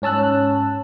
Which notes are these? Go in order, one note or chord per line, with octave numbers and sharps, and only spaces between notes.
G#2 C#4 A5 E6 F#6